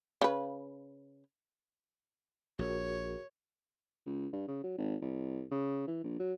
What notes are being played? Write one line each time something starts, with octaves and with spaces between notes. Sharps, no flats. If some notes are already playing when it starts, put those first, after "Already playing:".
C#3 B4
A#1 F#4 G#4 A#4 C#5
C#2
G2
C#3
F#3
G#1
C2
C#3
E3
A#1
F#3